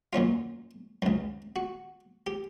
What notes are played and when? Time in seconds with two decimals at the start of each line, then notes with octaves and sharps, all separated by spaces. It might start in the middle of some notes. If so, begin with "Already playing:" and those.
0.13 F#2 A#2 C#4 F4
1.02 C#2 F#2
1.56 F#4
2.27 G4